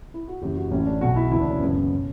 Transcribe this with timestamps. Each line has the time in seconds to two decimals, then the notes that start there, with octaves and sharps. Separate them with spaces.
0.14 E4
0.28 F#4
0.42 F#1 F#2 E3 G4
0.56 F#4
0.71 A1 A2 E3 C#4
0.86 D4
1.01 B1 B2 F#4
1.16 E4
1.31 D2 C#3 E3 E4
1.41 D4
1.50 C#4
1.60 F#1 F#2 C#3 E3 B3
1.76 C#4
1.95 B2